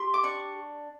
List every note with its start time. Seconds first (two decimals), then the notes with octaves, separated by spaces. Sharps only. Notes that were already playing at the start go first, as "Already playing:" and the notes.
Already playing: G4 C6
0.14 D6
0.23 D4 C#6